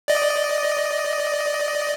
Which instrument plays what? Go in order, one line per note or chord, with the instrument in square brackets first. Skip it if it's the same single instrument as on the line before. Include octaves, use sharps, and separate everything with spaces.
[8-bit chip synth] D5 D#5